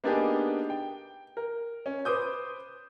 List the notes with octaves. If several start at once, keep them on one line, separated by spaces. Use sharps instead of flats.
A#3 B3 D4 D#4 G4 G#4
G5
A#4
C#4
B4 C5 D6 D#6 G6